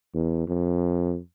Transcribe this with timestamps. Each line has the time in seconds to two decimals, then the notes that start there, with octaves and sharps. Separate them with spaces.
0.14 E2
0.48 F2